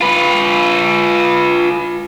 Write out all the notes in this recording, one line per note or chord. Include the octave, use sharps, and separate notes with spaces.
F4 B4